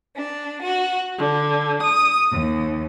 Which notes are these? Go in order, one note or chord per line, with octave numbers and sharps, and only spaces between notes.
D4
F#4
D3
D#6
D#2